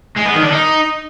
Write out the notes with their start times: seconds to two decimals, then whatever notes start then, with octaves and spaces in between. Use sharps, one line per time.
0.16 G#3
0.25 B3
0.34 D#3
0.43 D4
0.51 D#4